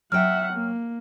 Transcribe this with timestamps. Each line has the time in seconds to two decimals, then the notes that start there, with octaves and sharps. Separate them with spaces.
0.12 F#3 E5 F#5 G5 F6
0.53 A#3